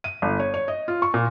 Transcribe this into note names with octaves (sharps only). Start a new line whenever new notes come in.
D#7
G1
C#5
C#5
D#5
F4
C#6
A#2